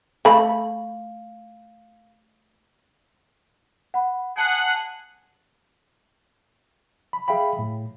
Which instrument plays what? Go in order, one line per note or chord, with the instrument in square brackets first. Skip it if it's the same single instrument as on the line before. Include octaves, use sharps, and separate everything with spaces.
[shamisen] A3 B5 [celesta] F5
[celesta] F#5 B5
[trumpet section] G#4 F#5 [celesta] A5
[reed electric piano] B5
G#4 E5 F5 G5 B5
A2